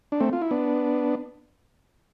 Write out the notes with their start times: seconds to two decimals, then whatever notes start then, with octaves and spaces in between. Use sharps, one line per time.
0.12 D4
0.20 A3 C4
0.33 F4
0.42 E4
0.51 B3 D4